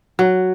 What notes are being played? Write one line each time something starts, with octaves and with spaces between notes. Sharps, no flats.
F#3